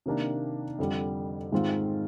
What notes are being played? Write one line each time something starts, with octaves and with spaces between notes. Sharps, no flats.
C3 D#3 A#3 D4
F2 D3 G3
G#2 D#3 G#3 C4 F4